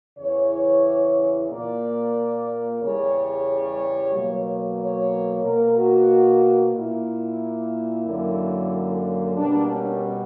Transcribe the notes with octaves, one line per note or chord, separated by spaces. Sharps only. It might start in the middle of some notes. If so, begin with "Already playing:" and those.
E2 C#3 E3 C#5
A#2 A#3 D5
E2 C#3 G3 C#5
B2 F#3 A#3
C#5
B2 A#3 A#4
F#4
A#2 A#3 E4
F#2 D3 F#3 A#3
B2 G3 A#3 D4
C#4